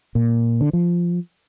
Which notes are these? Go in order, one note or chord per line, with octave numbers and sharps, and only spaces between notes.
A#2
D3
F3